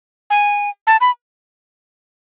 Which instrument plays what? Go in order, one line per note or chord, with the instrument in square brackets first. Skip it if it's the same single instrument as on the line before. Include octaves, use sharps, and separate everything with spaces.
[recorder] G#5
A5
B5